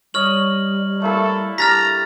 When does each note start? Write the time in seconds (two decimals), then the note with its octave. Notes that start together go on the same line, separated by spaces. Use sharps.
0.14 G3 C#5 D#5 F6 F#7
1.02 A3 A#3 E4 A4
1.58 G3 D4 A#5 F6 A6 B6